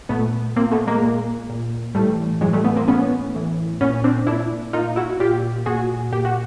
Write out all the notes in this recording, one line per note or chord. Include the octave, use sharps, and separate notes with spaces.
A#2 A3 B3
A#2 A#3 C4
A3 B3
G#3 A#3
A#2
A#2
A2 E3 G3 A3
A2 E3 F#3 G#3
G3 A3
A3 B3
A#3 C4
A2 E3 B3 C#4
A2 E3
A#2 B3 C#4
C4 D4
A#2 D4 E4
A#2 D#4 F4
E4 F#4
A#2 F4 G4
A#2 F#4 G#4
A#2 G4
F#4